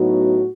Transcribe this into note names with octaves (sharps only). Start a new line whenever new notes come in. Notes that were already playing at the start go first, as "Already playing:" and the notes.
Already playing: A2 F#3 B3 D#4 F#4